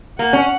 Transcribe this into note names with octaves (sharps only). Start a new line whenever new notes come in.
A#3 F#5
C#4